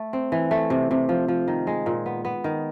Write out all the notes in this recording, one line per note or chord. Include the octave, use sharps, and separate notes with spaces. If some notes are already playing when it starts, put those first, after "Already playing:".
Already playing: A3
C4
E3
A3
C3
C3
F3
F3
D#3
G#3
A#2
B3
B3
D#3